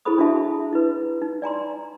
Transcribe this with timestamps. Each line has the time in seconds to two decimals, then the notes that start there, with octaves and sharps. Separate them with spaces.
0.05 E4 G#4 A4 C5 B5 D#6
0.18 D4 E4 F#4 G#4 E5 A5
0.73 E4 B4
1.22 D#4
1.42 D5 G#5 A#5 C6